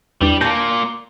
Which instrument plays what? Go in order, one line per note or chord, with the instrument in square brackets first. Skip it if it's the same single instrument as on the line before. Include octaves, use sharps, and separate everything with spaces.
[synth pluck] E2 D4 [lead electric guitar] G3
[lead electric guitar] A#2 A#3 [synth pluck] A5 G6 A#6